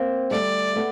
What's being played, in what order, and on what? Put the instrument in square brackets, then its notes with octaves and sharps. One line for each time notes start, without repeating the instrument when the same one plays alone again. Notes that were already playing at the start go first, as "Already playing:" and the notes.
Already playing: [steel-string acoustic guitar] A#3 C4
[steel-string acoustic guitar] G3 A3 [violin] D5
[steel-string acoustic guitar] A3 B3